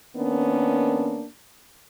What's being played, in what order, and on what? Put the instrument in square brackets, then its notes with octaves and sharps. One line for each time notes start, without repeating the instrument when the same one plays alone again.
[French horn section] D#3 A#3 B3 C#4 D4